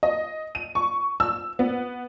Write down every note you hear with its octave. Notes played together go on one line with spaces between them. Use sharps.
D#5
D#7
C#6
E6
B3